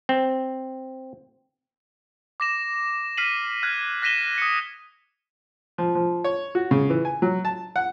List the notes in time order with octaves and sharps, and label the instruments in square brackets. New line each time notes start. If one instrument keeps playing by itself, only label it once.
[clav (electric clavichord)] C4
[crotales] D6 A#6 E7
F6 B6 C7 D#7 F#7
F6 F#6 G#6
F#6 A#6 B6 D#7 E7 G7
D#6 C#7
[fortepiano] F3
F3
C#5
F#4
C#3
E3
G#5
F#3
A5
F#5